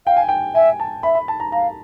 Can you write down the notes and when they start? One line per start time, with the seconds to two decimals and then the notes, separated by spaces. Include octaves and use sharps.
0.06 F5 G5
0.17 G#5
0.29 G5
0.54 E5 G#5
0.80 A5
1.03 E5 B5
1.15 B5
1.28 A5
1.40 A#5
1.52 F5 A#5